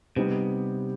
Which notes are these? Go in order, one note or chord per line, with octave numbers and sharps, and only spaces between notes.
C3 G3 B3 D#4 G4 B4